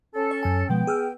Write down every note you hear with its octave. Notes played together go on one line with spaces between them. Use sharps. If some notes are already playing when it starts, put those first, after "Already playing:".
C#4 A4
C#5
F#2 G#5
B2 F3 G#3 B3 G5
G#4 E6 F6